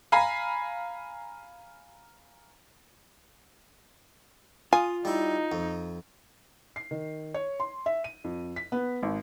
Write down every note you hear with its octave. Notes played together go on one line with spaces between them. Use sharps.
F5 G#5 A#5 B5
F4 G#5 D#6
G3 D#4 E4
F2
C7
D#3
C#5
C6
E5
D#7
F2
B6
B3
G#1